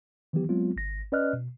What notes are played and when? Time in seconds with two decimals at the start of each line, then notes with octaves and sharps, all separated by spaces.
0.33 D#3 E3 F#3 B3 G4
0.49 F#3 G#3 B3 C4 F4
0.76 G#1 A#6
1.12 C#4 B4 D5 D#5 F6 F#6
1.33 B2